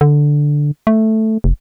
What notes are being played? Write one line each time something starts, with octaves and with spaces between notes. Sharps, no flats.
D3
A3
F1